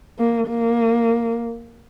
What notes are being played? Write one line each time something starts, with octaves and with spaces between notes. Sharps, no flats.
A#3
A#3